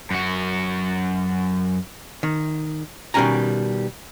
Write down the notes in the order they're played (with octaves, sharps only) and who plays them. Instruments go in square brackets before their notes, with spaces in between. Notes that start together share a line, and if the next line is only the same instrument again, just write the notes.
[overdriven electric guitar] F#2 F#4
[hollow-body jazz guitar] D#3
B2 D#3 G3 C#4 G#5 A#5